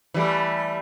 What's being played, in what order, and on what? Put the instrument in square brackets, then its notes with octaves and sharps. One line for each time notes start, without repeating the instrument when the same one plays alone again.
[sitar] E3 G3 A3